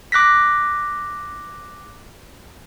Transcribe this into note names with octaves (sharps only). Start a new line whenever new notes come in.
D6 F#6 A#6 B6